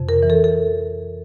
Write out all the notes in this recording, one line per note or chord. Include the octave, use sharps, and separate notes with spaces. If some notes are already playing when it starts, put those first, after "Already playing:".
Already playing: F2 C3
A#4
E3
A4
A4